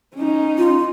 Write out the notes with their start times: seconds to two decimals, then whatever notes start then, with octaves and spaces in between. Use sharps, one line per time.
0.16 C#4 D#4
0.58 F4